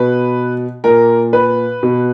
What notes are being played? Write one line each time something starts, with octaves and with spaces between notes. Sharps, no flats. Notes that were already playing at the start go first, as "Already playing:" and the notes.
Already playing: B2 B4
A#2 A#4
B4
B2